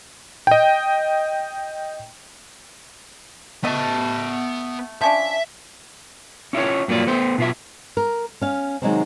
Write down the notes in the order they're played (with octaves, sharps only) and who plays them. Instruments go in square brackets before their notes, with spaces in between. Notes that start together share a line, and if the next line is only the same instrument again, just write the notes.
[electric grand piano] D#5 G5
[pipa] A3 D#5 [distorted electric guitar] B3 A5
[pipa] F3 C#4 D4 [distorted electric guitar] E5
[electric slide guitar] C#4 E4 F4 C#5
G2 F#3 A#3 F4 D5
A3 B3 C5
B2 F4 E5
[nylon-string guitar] A#4
C#4 F5
C3 D#3 F#3 G#3 A#3 C4